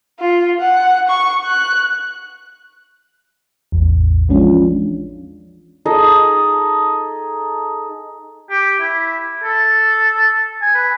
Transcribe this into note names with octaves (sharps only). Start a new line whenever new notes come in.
F4
F#5
C#6
F#6
A1 E2
E3 F3 G#3 C#4 D4 F4
D#4 G#4 A4 D#5
G4
E4
A4
G#5
B4